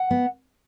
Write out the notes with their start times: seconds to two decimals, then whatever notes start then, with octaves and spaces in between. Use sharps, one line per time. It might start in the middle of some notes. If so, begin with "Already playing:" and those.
Already playing: F#5
0.11 B3